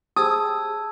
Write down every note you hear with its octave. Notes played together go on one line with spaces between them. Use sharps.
G4 G#4 C5 A5 D#6 E6 G#6